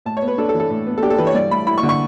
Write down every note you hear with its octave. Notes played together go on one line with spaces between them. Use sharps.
A2 A5
C#5
B3
B4
D4 A4
A4
E3
A4
A2
B3
A4
D4 G4
A4
E3 B4
C#5
G2 D5
A3 B5
E4 B5
C#6
D3
C#6